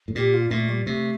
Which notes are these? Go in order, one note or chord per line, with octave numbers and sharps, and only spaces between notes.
A2
A#2 G4
F4
A#2 A3
G3
C3 A3